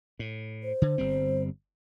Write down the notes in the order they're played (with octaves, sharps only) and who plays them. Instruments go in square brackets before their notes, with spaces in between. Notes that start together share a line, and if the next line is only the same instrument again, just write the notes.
[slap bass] A2
[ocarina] C5
[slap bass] D3
G1 G3 C4